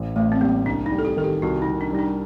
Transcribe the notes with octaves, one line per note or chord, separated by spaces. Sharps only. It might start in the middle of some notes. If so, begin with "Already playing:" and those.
Already playing: A1
A1 A3
C4
G3 A#3
C2 D4
D#4
G3
A4
G4
D#3 A4
G4
C2 F#4
D#4
C2
D4
G3 D#4
D4